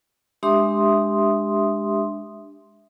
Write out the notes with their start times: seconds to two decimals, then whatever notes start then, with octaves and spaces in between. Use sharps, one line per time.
0.43 G#3 D4 G4 E5 C6 D#6